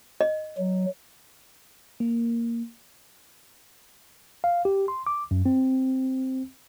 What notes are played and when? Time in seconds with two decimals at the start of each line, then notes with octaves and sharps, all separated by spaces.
0.21 D#5
0.57 F#3
2.00 A#3
4.44 F5
4.65 G4
4.88 C6
5.07 D6
5.31 F#2
5.46 C4